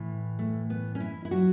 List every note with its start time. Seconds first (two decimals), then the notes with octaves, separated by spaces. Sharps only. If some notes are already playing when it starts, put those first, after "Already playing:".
Already playing: A2 E3
0.39 A3
0.70 B3
0.95 C#4
1.00 E4
1.25 E4
1.31 F#3 F#4